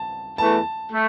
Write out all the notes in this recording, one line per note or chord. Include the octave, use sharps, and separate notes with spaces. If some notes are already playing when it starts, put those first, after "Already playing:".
Already playing: A5
E2 E3 A3 A5
A3